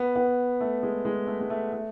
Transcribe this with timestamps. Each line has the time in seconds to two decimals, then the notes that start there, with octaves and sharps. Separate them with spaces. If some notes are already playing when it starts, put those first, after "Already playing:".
Already playing: B3
0.16 B3
0.61 A3
0.83 G#3
1.05 G#3
1.27 A3
1.41 G#3
1.50 A3
1.72 A3